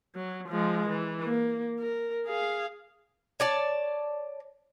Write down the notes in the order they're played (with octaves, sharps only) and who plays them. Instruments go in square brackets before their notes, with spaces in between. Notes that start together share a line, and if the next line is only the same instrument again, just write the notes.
[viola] F#3
F3 G#3
E3
A#3
A#4
G#4 F5
[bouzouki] C#5 D5 A5